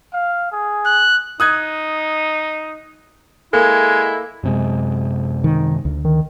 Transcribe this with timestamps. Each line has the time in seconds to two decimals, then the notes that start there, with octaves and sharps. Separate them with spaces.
0.13 F5
0.52 G#4
0.86 F#6
1.40 D#4 D#6 F#6 G#6
3.53 G#3 A#3 E4 A4
4.43 F#2 C3 G#3
5.44 D#3
5.85 D2
6.05 D#3